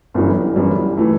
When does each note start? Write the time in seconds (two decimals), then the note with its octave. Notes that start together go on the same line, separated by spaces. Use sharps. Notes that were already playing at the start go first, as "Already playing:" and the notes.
0.14 G1 F#2 E3 G3
0.56 G1 F#2 E3 G3
0.97 E3 A3